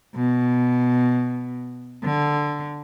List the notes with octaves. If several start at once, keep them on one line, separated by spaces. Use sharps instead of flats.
B2
D3